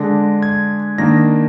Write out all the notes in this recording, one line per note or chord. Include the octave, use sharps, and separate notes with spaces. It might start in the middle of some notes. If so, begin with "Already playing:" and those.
Already playing: D3 G#3 D4 A#6
G#6
D#3 A#3 D4 A#6